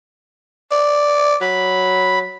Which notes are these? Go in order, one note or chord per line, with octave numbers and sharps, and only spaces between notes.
D5
F#3 B5